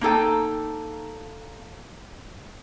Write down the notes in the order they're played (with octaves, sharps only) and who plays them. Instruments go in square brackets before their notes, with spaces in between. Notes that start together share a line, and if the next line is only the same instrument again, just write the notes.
[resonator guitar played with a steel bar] A#3 D#4 A4 G5